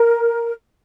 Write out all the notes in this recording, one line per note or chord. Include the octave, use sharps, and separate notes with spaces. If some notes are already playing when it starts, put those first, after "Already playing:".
Already playing: A#4